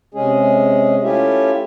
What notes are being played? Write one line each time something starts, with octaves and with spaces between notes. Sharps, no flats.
C3 G#3 C#4 G#4
A3 C#4 E4 F4 G4 E5